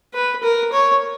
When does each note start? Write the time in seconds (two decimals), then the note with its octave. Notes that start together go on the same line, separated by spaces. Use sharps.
0.14 B4
0.43 A#4
0.73 C#5